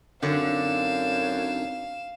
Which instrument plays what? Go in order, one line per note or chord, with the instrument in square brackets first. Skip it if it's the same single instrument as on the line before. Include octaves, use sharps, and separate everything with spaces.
[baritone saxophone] F#2 [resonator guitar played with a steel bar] D3 [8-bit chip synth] C4 D4 D#4 [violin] F5 E7